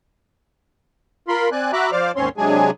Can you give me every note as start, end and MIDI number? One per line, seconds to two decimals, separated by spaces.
1.28 1.49 65
1.28 1.49 70
1.28 1.49 83
1.28 1.49 84
1.52 1.71 60
1.52 1.71 74
1.52 1.71 80
1.52 1.71 90
1.73 1.91 66
1.73 1.91 76
1.73 1.91 82
1.73 1.91 83
1.73 1.91 86
1.73 1.91 90
1.92 2.12 53
1.92 2.12 72
1.92 2.12 74
1.92 2.12 77
1.92 2.12 86
1.92 2.12 89
2.16 2.29 39
2.16 2.29 44
2.16 2.29 60
2.16 2.29 61
2.16 2.29 73
2.16 2.29 84
2.37 2.71 48
2.37 2.71 54
2.37 2.71 56
2.37 2.71 62
2.37 2.71 68
2.37 2.71 80